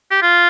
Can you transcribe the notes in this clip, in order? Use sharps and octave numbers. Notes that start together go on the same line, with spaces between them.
G4
F4